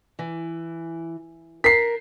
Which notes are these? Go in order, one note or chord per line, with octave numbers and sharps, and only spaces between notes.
E3
A#4 B6 C7